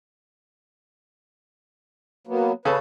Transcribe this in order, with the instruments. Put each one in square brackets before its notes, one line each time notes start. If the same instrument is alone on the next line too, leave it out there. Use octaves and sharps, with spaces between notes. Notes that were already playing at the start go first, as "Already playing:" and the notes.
[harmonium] F#3 A#3 B3
[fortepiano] C#3 A4 [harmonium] B4